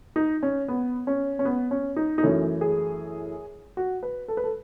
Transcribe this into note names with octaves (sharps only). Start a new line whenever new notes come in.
D#4
C#4
B3
C#4
C#4
B3
C#4
D#4
D#4
F#2 E3 A3 C#4
G#4
F#4
B4
A4
B4
A4